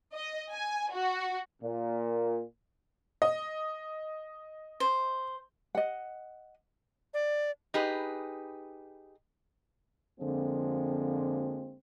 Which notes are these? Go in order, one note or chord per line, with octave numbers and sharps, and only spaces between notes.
D#5
G#5
F#4
A#2
D#5
C5
D#5 F#5
D5
D#4 G4 G#4 B4
F2 D3 F3 G#3 A#3 C4